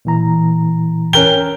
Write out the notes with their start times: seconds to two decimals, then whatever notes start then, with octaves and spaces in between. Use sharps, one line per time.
0.05 A#2 E3 A#5
1.13 C#4 A#4 G5 G7